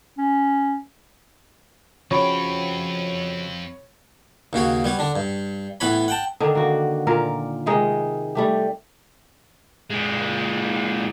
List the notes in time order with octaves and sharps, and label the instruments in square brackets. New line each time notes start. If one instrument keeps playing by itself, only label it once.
[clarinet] C#4
[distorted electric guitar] F2 G5 [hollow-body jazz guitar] C#3 F3 F#4 [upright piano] C#5 [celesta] B5 C#6
[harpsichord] D#2 C#3 F#4 C#5
G3 B3 C#5
D3 D4
G2
A2 E3 B3 B4 C#5 B5
F#5 G5 A5
[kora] D3 D#3 D4 D#4
A#3 F#4
A#2 A#4 F5
C3 D#3 G#3 D#4
G3 A3 G4
[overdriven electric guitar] A#2 G#3